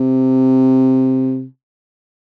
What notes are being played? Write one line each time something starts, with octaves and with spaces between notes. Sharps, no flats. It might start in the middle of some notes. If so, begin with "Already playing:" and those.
Already playing: C3